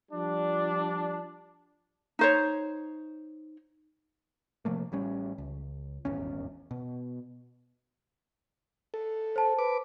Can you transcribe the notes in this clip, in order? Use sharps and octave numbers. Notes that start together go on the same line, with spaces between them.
F3 G3 D4
D#4 C5 C#5
C3 F3 A3 A#3
A1 G3 C#4
C#2
D#1 G#1 E2 C#4
B2
A4
C5 A5
B4 D6